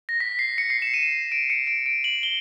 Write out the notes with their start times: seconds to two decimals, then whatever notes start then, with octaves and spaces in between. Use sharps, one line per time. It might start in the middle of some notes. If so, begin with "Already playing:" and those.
0.09 A#6
0.20 B6
0.39 C7
0.58 C#7
0.70 C7
0.82 E7
0.94 D#7
1.32 D7
1.50 C#7
1.67 D7
1.86 D7
2.04 F#7
2.23 G7